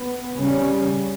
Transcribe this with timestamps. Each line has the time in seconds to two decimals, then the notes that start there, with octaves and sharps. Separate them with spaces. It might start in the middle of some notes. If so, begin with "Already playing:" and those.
Already playing: B3
0.36 C#3 G3 C#4